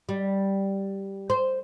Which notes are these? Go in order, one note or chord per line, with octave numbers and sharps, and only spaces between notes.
G3
C5